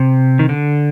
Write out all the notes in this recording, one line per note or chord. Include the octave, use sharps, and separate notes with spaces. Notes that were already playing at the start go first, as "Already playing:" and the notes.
Already playing: C3
D#3
D3